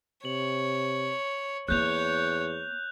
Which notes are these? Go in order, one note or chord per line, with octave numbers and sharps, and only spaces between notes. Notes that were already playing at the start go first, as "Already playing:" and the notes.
C3 C#5 F#7
E2 A#3 B3 C#5 F#6 G6 F7